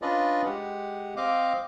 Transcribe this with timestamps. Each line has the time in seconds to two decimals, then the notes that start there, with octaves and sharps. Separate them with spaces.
0.02 C#4 D4 F4 B4 D5 D#5
0.45 G#3 G4 F#5
1.17 C4 D#5 F5 D6